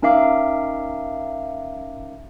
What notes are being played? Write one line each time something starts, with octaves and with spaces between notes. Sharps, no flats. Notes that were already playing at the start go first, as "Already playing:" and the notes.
C#4 D#4 A#4 E5 F5 D6